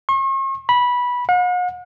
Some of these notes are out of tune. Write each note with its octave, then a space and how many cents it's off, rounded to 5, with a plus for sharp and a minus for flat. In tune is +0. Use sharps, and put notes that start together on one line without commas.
C#6 -45
B5 -15
F#5 -45